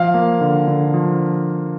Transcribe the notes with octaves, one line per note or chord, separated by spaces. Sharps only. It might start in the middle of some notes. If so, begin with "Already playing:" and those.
Already playing: F3 F5
A#3
D3
D3
F3